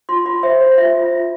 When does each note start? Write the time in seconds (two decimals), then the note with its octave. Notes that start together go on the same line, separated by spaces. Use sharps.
0.09 F4 C6
0.26 F4 B5
0.43 C5 E5
0.60 C5
0.78 F4 E5
0.95 F4
1.13 F4